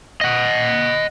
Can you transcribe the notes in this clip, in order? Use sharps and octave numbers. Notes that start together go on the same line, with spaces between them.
D#5 F#5